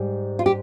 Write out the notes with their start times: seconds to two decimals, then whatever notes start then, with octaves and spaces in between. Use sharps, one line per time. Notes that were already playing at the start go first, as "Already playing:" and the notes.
Already playing: G#2 G3
0.39 F4
0.46 G4